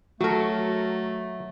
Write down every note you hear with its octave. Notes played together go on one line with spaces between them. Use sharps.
F#3 A3 F#4 A4 A#4